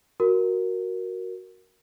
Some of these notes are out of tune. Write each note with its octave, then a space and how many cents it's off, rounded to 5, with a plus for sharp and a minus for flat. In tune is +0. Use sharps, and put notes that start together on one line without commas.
F#4 +0 A#4 +0